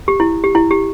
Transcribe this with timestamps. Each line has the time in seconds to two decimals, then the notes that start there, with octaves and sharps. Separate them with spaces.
0.08 G4
0.20 E4
0.44 G4
0.55 E4
0.71 G4